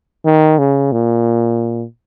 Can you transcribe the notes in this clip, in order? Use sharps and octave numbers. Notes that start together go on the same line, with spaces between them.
D#3
C#3
A#2